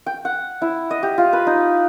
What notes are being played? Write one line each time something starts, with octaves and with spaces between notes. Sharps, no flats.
G5
F#5
E4
D#5
G4
F4
B4
D#4